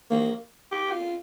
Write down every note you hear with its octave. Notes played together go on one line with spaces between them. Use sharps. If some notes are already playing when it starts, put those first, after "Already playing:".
A#3
G4
F4